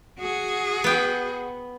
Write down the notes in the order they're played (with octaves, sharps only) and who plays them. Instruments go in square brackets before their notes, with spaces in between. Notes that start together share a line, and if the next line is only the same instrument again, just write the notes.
[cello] F#4 G#4
[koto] B3 G5